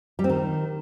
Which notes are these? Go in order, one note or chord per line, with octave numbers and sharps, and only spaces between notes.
G3
C4
D#3